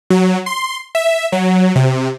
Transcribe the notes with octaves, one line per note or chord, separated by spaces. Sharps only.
F#3
C6
E5
F#3
C3